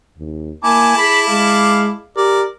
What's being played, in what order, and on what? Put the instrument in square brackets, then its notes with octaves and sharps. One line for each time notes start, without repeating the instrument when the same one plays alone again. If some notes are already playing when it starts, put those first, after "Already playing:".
[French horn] D#2
[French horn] A#3 [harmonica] E4 A5 D6 [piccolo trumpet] G#5
[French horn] G#4 [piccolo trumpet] B5
[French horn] G#3 [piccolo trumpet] F5
[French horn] G4 [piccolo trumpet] A#4 [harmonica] D5